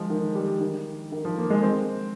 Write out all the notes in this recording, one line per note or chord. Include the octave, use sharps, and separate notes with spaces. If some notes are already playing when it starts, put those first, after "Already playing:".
Already playing: F3 G#3
D#3
G3
D#3
D#3
F3
A#3
G#3
C4